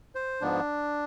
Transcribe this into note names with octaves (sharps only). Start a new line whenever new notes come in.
C5
G#2 F3 B3 D4